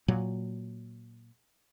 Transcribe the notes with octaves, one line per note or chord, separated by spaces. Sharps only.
A#2 F#3